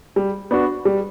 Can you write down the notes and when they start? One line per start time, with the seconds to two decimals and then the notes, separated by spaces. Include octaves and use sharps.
0.16 G3
0.51 B3 D4 F#4
0.85 G3